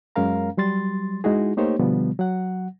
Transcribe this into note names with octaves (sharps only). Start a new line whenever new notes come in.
F#2 G#3 C#4 A#4 F5 A#5
F#3 G3 C6 A6
G#3 D#4 E4 F#4 G#4
A3 A#3 D#4 G4 C5 C#5
B2 D3 F3 G3 B3
F#3 F#5